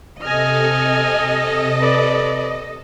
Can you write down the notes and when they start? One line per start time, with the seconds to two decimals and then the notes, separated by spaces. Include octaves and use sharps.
0.23 C3 A4 D#5 G#5 F6
1.80 B4 D5